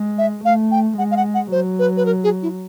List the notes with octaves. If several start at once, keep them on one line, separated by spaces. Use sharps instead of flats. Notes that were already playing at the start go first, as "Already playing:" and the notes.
Already playing: G#3
E5
A3 F5
G5
G#3 F#5
F5
F#5
F#5
F#3 C5
B4
B4
A#4
G#4
E4